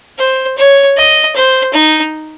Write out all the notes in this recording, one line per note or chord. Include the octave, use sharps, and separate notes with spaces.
C5
C#5
D#5
C5
D#4